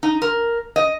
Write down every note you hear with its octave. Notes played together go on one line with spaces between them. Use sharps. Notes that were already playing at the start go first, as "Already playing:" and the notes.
D#4
A#4
D#5